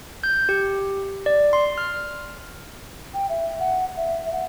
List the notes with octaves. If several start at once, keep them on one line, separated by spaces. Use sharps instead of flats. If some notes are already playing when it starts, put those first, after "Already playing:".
G6
G4
D5
C6
F6
G5
E5
F#5
E5
F#5